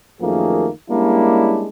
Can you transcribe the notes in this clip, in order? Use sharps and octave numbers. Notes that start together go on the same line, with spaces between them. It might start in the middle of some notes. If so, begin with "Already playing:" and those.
F#2 D#3 F3 A3 A#3 G#4
G3 G#3 A#3 C#4 D4 E4